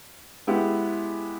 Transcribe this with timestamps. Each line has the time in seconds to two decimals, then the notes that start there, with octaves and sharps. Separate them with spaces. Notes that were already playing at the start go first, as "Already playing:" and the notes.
0.47 G#3 B3 E4 G4